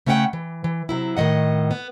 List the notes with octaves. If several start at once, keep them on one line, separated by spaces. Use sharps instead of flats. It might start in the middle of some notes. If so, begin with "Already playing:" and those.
C#3 A3 C#4 B4 F#5 G5
E3
E3
C3 F#3 E4
A2 D#3 F#3 D#5 F#5
B3